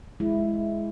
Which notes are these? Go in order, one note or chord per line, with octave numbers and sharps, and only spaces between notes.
G#3 E4